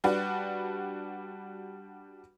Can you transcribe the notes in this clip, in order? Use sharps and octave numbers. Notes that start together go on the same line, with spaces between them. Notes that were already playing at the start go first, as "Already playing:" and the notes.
G3 D4 F#4 B4